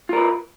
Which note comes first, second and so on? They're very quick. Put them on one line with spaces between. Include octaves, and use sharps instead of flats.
F4 A#4 B4